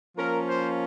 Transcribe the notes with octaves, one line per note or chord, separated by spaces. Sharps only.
F3 A#3 C#4 A#4
C5